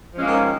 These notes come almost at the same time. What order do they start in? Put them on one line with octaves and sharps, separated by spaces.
F3 C#4 G#3 A#3 D#3